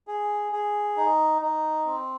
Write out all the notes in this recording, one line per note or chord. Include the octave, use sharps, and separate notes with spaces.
G#4
G#4
D#4
D#4
C4